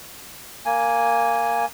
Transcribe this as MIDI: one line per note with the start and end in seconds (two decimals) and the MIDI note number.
0.66 1.65 58
0.66 1.65 80